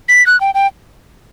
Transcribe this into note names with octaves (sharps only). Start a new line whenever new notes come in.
B6
F#6
G5
G5